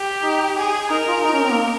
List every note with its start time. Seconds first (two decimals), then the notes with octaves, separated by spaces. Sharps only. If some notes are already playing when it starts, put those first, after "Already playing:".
Already playing: G4
0.23 D#4
0.57 G#4
0.91 D#4 A#4
1.08 F4
1.24 D#4
1.33 C#4
1.42 C4
1.50 A#3